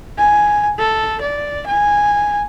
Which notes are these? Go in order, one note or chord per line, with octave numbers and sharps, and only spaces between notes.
G#5
A4
D5
G#5